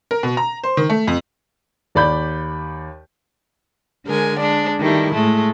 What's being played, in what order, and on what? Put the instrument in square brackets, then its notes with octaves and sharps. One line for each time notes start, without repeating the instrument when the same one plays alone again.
[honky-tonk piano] A#4
B2
A#5
C5
D#3
A3
F2
[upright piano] D#2 D5 B5 G6
[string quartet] D3 G#3 A#4 G#5
G#3 D4 D5
D#3 G3 A3 E4
A2 G#3 A3